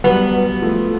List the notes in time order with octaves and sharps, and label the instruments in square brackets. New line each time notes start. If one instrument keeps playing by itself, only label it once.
[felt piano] F#3 G3 [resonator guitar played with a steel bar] B3
[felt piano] F3 A3